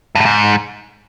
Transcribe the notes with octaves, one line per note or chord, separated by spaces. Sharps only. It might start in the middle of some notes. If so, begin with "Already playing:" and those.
G2
A2
G#2